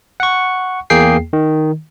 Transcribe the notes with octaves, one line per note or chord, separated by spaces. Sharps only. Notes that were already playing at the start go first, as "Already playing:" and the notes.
F#5 C#6
E2 A#3 G#4 G5 C7
D#3